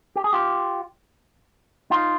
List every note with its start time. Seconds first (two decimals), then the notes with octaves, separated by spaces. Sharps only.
0.16 G4
0.24 G#4
0.33 F4 G4
1.90 D#4 F4